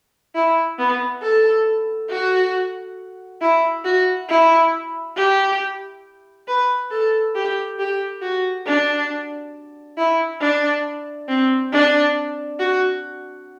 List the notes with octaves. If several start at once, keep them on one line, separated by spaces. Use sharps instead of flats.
E4
B3
A4
F#4
E4
F#4
E4
G4
B4
A4
G4
G4
F#4
D4
E4
D4
C4
D4
F#4